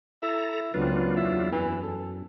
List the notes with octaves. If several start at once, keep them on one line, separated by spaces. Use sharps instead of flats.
E4 A4 A#5
C#2 F#3 A#3 C4 D4 F4 B4
E2 E4
F#2 E3
A4